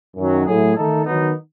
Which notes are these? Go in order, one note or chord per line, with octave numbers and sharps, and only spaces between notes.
F#2 D#3 F#3
A2 F#3 A3 E4 G#4
D#3 A3 D#4 A4
D#3 F#3 B3 D#4